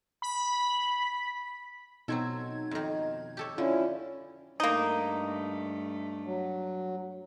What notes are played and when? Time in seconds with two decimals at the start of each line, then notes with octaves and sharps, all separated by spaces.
0.22 B5
2.08 B2 F#3 C4 D#4 A4 G#6
2.71 F2 D#3
3.37 G4 A4 C#5
3.58 D3 C#4 E4 F4
4.60 G2 A3 A#3 D#4
6.25 F#3